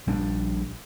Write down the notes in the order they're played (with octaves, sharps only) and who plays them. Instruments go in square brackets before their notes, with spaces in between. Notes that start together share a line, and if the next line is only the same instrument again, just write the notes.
[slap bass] A#1 G3 D4